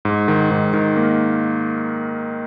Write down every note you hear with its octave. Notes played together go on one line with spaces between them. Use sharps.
G#2
D#3
G#2
D#3
A#3